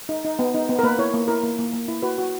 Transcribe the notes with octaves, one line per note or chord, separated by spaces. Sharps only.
D#4
D#4
B3
D#4
B3
A#4
A#3 B4
E4 C#5
A#3
E4 A#4
A#3
A#3
A#3
E4
F#4 B4
F#4